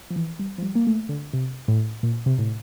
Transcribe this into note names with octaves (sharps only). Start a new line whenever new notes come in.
F3
E3
G3
F3
G3
A#3
A3
D3
C3
A2
A#2
C3
A2